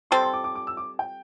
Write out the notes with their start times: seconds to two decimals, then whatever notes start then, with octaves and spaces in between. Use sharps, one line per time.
0.11 G3 C4 A4 C6
0.23 C6
0.33 D6
0.44 D6
0.55 D6
0.67 E6
0.77 D6
0.99 G5